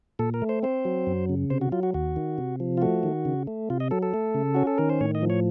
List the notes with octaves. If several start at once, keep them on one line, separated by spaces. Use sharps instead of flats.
A#2 A4
A#4
A3
C5
C4 C5
F#3
F#2
C#3
C3 C5
F#4
F#3 F4
F#4
D#2 F#4
D#3
C3
F3
F4
A3 F#4
D#3
C#3
A3
C3 F4
D#5
F#3 A4
A4
A3
C#3
C#4 F#4
A4
D#3 A#4
C5
A2 C#5
D#5
F3
C#5